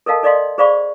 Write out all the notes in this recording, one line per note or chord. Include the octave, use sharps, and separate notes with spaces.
A4 A#4 D#5 F5 A5
A4 D5 D#5 F5 C6
G#4 C5 D5 F5 B5 C#6